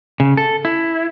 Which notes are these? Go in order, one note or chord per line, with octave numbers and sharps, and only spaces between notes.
C#3
A4
E4